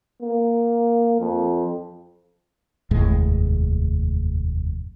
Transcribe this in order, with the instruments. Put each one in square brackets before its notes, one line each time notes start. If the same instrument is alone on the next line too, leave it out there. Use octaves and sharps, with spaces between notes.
[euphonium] A#3
F2
[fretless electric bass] F1 D#2 A2 G#3